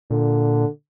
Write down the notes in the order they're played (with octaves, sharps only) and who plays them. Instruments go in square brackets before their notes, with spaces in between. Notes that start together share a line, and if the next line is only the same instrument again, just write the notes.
[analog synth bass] A#2 [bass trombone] D3